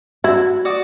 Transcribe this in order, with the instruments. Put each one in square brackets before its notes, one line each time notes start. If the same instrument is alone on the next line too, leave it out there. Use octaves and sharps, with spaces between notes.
[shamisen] E4 [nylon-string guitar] F#4
[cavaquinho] F#4 D5 D#6